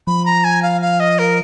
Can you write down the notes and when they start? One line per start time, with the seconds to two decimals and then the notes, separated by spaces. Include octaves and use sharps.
0.07 F3 B5
0.26 A#5
0.44 G#5
0.62 F5
0.81 F5
1.00 D#5
1.19 A#4